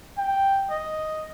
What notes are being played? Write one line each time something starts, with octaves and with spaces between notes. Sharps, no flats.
G5
D#5